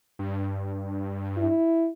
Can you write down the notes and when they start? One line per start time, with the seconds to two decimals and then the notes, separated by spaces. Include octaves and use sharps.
0.19 G2
1.37 E4